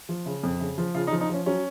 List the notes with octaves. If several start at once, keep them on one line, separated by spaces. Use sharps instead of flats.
F3
C#3
F2
C#3
F3
C#3 F4
D#4
F3
D#4
F3 C#4
F#3 C#4